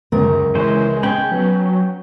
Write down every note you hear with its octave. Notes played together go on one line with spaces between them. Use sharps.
C#2 F#2 A#4
C#3 E3 G#3 C5
C#4 G5 B5
F#3 B3